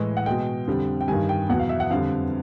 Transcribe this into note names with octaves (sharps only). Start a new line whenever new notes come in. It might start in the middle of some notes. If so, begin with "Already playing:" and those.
Already playing: A2 E3 G#3
F#5
B2 G#3 G5
F2 D3 G3
G5
G2 D#3 G3 G#5
G5
E2 B2 F#3 F#5
F5
E5
F#5
F2 D3 G3 F5